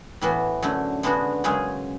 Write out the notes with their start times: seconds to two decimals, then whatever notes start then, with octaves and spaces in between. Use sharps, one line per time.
0.21 A2 E3 B3 F#4
0.62 F#2 D3 A3
1.03 D3 G#3 B3 D4 F#4
1.44 F#2 C#3 G#3 C#4 G#4